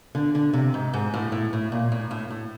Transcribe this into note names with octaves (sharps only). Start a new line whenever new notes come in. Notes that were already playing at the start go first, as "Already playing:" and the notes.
D3
D3
C3
G#2
G#2
A2
A2
A2
A#2
A2
A2
A2